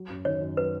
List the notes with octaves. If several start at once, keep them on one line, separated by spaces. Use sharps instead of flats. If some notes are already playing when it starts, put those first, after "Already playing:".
Already playing: F#3
F#2
D#3 C#5
F#2
F#3 B4